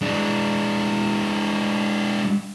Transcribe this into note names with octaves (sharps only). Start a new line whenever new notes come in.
G#3 D4